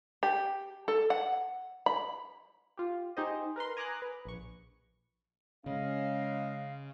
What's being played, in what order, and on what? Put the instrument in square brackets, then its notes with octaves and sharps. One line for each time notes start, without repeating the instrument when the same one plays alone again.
[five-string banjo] G4
A4
F#5
B5
[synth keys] F4 G4
D#4 G4 G#4 C5 D#5
A#4 B4 A#5 C6
G#5 A#5 D6 D#6 F#6
B4
A#1 C#6
[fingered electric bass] C#3 [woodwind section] G#3 D#5 F5 [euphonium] C#4